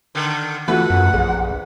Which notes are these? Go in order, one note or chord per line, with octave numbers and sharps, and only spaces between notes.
D3 D#3
E3 A3 F4 F#4 B4 F#5
F#2
A#1 G#4